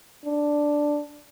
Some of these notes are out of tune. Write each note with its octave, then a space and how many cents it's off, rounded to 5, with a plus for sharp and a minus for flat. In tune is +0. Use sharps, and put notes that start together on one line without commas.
D4 +0